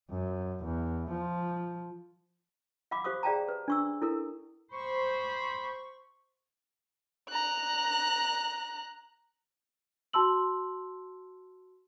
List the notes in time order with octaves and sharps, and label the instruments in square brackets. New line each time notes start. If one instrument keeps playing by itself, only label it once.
[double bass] F#2
E2
F3
[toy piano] F5 F#5 B5 D6
G4 C5 F5 C#6 D#6
G#4 D5 F5 G5 A5 A#5
B4
D4 C#6 E6
E4 A4 A#4
[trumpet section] G4 B5 [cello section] C5 [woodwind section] C#6
[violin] A#5 F#6
[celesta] F#4 A5 C6 E6 F#7